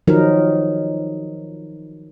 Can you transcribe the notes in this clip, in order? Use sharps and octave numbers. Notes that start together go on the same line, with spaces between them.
D#3 F3 F#3 D#4 A#4